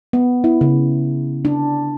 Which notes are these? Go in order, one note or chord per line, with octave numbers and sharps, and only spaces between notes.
B3
E4
C#3
D4